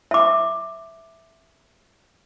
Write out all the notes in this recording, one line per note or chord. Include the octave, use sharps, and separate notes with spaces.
E5 D6